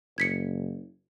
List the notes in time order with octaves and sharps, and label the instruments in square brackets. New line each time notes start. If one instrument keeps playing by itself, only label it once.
[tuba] F#1 [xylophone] G#6 B6 C#7